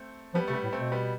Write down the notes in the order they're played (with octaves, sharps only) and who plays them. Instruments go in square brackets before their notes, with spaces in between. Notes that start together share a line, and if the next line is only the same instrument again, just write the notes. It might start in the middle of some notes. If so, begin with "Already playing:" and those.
Already playing: [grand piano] A3 C4
[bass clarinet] F3 [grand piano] G3 B3
[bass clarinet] C3 [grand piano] A3
[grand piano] G3 B3
[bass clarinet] A2
[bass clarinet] B2 [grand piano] A3 C4
[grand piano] G3 B3